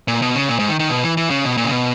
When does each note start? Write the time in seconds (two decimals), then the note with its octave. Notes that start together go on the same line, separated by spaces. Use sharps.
0.08 A#2
0.22 B2
0.35 C#3
0.49 A#2
0.59 G#2
0.69 D#3
0.80 D#3
0.89 B2
1.03 E3
1.17 E3
1.30 C#3
1.44 B2
1.57 A#2
1.65 C#3
1.71 B2